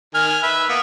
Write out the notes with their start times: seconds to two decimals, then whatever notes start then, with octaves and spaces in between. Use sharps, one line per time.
0.14 D#3 G#5 F6
0.43 B4 E5
0.69 A#3 B3